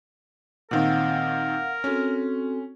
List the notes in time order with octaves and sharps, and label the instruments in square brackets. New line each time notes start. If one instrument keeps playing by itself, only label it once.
[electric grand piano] A#2 D#3 C4 [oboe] A#4 [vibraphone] F5 F#5
[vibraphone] C4 F#4 A4 [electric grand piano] C#4